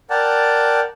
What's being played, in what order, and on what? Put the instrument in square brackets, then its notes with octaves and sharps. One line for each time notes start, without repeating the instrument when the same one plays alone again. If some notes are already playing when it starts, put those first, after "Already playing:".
[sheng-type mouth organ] A#4 D5 F#5 G5 A5